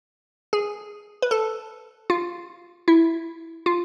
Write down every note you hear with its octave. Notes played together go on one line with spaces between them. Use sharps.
G#4
B4
A4
F4
E4
F4